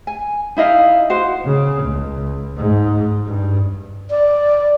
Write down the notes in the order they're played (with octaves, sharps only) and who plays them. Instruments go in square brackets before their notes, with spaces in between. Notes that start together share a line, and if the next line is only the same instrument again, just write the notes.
[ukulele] G#5
D#4 E4 D#5 F5
F#4 C5
[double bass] C#3
C#2
G#2
G2
[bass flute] D5